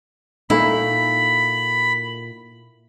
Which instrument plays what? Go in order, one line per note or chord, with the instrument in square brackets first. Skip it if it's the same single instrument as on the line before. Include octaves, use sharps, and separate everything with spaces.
[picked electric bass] A#2 [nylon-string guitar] A3 D#4 F#4 [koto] E4 [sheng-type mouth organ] B5